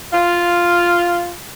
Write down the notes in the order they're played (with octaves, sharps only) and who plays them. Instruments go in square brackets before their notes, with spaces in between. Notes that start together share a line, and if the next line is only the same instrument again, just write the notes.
[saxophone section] F4